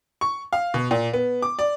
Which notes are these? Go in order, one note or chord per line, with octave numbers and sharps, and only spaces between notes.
C#6
F5
B2
A#2
B3
D6
D5